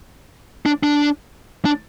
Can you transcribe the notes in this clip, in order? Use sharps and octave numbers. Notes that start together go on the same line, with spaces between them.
D4
D4
D4